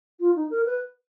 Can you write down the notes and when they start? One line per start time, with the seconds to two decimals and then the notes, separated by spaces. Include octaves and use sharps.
0.20 F4
0.35 D#4
0.50 A#4
0.65 B4